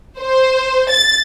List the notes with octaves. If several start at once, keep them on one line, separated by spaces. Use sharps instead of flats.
C5
A6